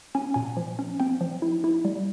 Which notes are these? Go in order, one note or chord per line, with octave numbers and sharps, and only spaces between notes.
C#4 G#5
A#2 G#5
F3
C#4
C4 G5
F3
E4
E4
G3